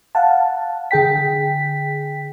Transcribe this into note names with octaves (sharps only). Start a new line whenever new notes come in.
F5 F#5 A5
D3 G#4 G5 B6